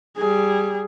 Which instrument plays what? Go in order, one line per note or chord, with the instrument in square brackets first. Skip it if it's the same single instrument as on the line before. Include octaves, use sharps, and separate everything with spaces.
[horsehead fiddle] G3 G#4